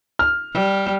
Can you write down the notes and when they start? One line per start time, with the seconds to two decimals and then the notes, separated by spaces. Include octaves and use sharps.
0.19 F6
0.53 G3